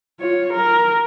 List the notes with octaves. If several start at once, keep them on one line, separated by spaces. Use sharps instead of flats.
F4 C#5
A#4